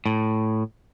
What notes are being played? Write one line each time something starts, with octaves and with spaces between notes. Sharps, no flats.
A2